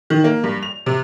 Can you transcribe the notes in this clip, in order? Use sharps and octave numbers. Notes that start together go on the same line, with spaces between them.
D#3
A#3
G2
F7
C3